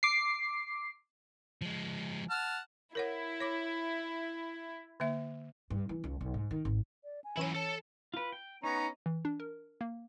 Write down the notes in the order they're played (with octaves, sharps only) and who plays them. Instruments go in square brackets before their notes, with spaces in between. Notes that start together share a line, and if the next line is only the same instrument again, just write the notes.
[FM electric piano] D6 C7
[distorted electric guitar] F3 G#3
[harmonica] F#5 A5 F6
[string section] E4 [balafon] A#4 C#5 F#5
[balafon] C#5 D6
D3 A#3 E5
[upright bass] G2
E3
C#2
B1
G#2
D#3
G#1
[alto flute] D5
G#5
[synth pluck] E3 C#4 D#7 [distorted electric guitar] F#3 E4
[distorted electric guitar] A4 A5 [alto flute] C#5
[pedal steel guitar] F4 B4
G5
[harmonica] B3 C#4 A#5 [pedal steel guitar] D#4
[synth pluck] E3
D4
A#4
A#3